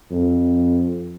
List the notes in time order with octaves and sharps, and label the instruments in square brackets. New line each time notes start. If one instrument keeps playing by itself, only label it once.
[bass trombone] F2